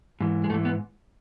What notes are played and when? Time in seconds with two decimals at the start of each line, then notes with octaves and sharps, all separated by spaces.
0.20 G#2 E3
0.44 G#3
0.50 G#2 A3
0.54 E3
0.65 B3